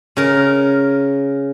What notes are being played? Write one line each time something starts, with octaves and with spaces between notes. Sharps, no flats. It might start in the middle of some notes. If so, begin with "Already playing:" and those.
C#3 A#4